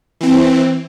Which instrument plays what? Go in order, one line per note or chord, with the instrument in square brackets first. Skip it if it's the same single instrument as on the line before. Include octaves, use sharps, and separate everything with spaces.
[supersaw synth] E3 C4